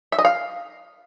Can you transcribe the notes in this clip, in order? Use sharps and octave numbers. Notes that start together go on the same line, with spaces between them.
E5
D#5
F5